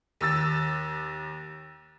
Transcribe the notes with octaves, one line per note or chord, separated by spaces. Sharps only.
D#2 E6 A6